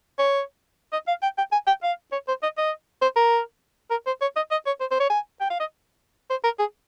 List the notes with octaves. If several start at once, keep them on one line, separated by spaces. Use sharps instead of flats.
C#5
D#5
F5
G5
G5
G#5
G5
F5
C#5
C5
D#5
D#5
C5
A#4
A#4
C5
C#5
D#5
D#5
C#5
C5
C5
C#5
G#5
G5
F5
D#5
C5
A#4
G#4